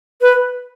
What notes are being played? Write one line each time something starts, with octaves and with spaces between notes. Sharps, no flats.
B4